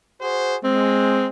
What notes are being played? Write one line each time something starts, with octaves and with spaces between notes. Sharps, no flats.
F#4 G#4 C5
G#3 C4